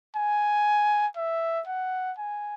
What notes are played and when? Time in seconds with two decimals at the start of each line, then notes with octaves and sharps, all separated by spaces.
0.16 G#5
1.16 E5
1.67 F#5
2.18 G#5